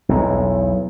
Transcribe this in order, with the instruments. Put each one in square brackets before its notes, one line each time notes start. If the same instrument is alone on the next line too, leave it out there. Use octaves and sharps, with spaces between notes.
[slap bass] B1 E2